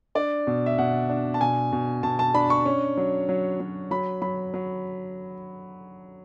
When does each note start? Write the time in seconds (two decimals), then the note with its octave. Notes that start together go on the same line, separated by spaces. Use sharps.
0.15 D4 D5
0.47 B2
0.66 E5
0.78 B2 F#5
1.09 D4
1.34 A5
1.41 B2 G#5
1.72 B2
2.03 B2 A5
2.19 A5
2.34 D4 B5
2.50 C#6
2.66 C#4
2.97 F#3
3.29 F#3
3.60 F#3
3.91 F#3 B5
4.22 F#3 B5
4.54 F#3